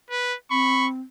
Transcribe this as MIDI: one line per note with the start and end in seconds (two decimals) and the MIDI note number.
0.11 0.35 71
0.51 0.98 60
0.51 0.89 83
0.51 0.87 85